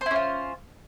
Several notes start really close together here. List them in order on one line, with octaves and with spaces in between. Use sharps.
C5 E4 C#4 F4